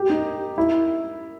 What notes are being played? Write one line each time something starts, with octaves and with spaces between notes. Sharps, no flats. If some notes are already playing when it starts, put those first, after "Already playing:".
Already playing: G4
D#4
E4